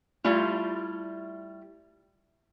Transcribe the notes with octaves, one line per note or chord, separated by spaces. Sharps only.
G3 A3 E4 F4